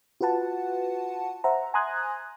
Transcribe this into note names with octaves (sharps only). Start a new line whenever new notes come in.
F4 F#4 B4 F#5 A5
C5 E5 F#5 A#5
G#5 A#5 C6 D#6 F#6 G#6